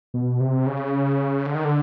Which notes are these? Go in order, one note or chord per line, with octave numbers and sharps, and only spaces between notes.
B2
C3
C#3
D3
D#3
D3